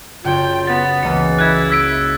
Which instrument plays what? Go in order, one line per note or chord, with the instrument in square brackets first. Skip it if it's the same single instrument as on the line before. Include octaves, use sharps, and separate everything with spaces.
[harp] F#1 C#5 [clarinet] F4 [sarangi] G5
[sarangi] B3 [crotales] A6
[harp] C#2 A#3 D#5 [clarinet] E3 [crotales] C#7
[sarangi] E4 [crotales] F#6 G#6
[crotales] E6 B6 D7